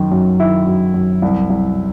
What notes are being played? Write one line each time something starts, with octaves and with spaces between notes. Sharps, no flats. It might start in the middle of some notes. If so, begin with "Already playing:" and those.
Already playing: F#2 D#3
F#2
D#3 E4
F#2
F#2
C2
C2